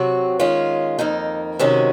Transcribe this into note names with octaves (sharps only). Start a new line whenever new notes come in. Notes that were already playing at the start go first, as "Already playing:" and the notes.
Already playing: C3 F#3 C4 F#4
D#3 G#3 C#4 F4
F2 D#3 A#3 D#4
C3 D#3 G#3 C#4 F#4